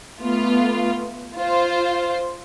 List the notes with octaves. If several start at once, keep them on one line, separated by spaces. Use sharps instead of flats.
A3 B3 F4
F4 C5